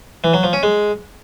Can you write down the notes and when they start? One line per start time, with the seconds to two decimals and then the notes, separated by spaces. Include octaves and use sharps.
0.24 E3
0.34 F#3
0.43 F3
0.53 C#4
0.63 G#3